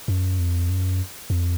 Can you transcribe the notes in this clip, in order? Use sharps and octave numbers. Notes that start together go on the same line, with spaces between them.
F#2
F2
F#2
F2